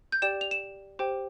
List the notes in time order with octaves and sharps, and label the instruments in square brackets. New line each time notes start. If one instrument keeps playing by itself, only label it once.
[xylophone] G6
G4 D5 G5 E7
F7
E7
G4 C5 G5